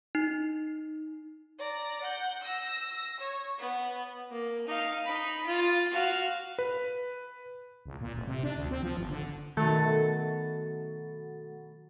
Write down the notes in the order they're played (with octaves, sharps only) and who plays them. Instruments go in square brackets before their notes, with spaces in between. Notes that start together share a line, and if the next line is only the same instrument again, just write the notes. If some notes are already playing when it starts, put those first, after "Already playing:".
[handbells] D#4
[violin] D5 A#5
F#5 G6
E6 A#6
C#5
B3
[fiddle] A#3
D#4 F5
D#4 B5
F4
F#4 F5
[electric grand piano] B4
[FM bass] C#2
A#2
F1
C3
D4
D2
C4
F3
G1
D3
[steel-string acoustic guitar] B2 F#3 A4 [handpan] D#3 [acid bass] A3